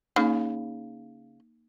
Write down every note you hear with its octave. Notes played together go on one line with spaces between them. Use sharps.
C#3 A#3 D#4